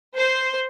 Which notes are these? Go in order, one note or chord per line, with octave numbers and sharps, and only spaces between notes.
C5